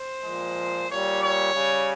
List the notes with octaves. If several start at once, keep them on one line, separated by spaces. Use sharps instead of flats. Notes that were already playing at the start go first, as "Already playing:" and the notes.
Already playing: C5
A#2 F3 G#3
A#2 G3 C#5
C#5
C#3 G3